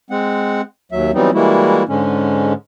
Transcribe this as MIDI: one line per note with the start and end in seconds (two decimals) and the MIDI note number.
0.10 0.61 56
0.10 0.61 60
0.10 0.61 78
0.92 1.11 39
0.92 1.11 54
0.92 1.11 76
1.14 1.30 52
1.14 1.30 54
1.14 1.30 55
1.14 1.30 59
1.14 1.30 60
1.14 1.30 63
1.34 1.83 52
1.34 1.83 55
1.34 1.83 56
1.34 1.83 58
1.34 1.83 64
1.34 1.83 66
1.89 2.53 44
1.89 2.53 50
1.89 2.53 56
1.89 2.53 61